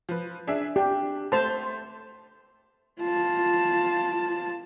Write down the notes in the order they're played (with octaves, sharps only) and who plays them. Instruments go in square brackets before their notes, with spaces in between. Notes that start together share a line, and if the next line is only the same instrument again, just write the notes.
[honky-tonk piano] F3 B4
D4 G#4 E5
[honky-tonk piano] D4 [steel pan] G4
[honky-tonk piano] A3 C6 F7 [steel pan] C5 A5
[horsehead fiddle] F4 A5